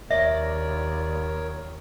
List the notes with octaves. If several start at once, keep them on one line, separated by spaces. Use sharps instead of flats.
D#2 A#4 C#5 D5 E5